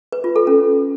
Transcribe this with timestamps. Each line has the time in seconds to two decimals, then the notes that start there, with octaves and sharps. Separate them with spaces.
0.12 B4
0.24 F4
0.36 A4
0.47 C#4